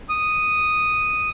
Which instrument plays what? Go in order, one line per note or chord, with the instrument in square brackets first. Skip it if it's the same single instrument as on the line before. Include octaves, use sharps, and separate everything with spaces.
[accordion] D#6